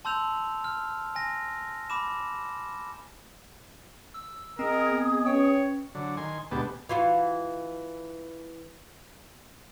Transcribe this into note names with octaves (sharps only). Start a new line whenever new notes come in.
A5 C6 E6 G6 F7
F6
G#5 A#6
B5 D6 E7
E6
C4 G#4 A#4 D#5 D#6
B3 D#5
C#4 B4 C#5 G5
D3 F#3
D#3 G#5 C6
D2 B2 G#3 B3 G4 A5
E3 F4 F#4